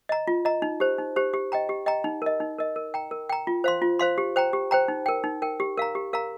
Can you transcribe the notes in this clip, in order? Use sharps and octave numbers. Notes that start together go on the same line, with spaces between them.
D#5 A#5
F4
D#5 A#5
D#4
G4 C5
D#4
G4 C5
G4
D#5 G5 A#5
G4
D#5 G5 A#5
D#4
A#4 D#5
D#4
A#4 D#5
A#4
G5 A#5
A#4
G5 A#5
F4
C5 F5 C6
F4
C5 F5 C6
G4
C5 G5 A#5
G4
C5 G5 A#5
D#4
A#4 G5
D#4
A#4 G5
G4
A#4 F5 A#5
G4
A#4 F5 A#5